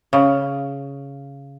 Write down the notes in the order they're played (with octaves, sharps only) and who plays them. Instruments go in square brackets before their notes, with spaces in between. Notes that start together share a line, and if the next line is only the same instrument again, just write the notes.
[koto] C#3